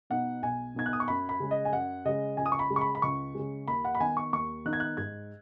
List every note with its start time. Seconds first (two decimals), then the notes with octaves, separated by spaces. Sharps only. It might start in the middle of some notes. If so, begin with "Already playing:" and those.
0.10 B2 B3 D#4 F#5
0.43 B1 G#5
0.75 B2 B3 D#4 G#6
0.86 F#6
0.93 D#6
1.00 C#6
1.08 F#2 B5
1.29 B5
1.40 C#3 G#3
1.51 D#5
1.65 G#5
1.72 F#2 F#5
2.05 C#3 G#3 D#5
2.37 C#2 G#5
2.46 D#6
2.52 C#6
2.59 B5
2.70 C#3 G#3
2.76 C#6
2.81 B5
2.95 B5
3.02 C#2 C#6
3.35 C#3 G#3
3.68 D#2 B5
3.85 F#5
3.95 B5
4.00 D#3 B3 D#4 G#5
4.17 C#6
4.33 D#2 C#6
4.65 D#3 B3 D#4 F#6
4.73 G#6
4.80 F#6
4.97 G#2 G#6